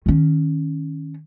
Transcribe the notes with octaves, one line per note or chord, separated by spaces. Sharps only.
D#3 C#4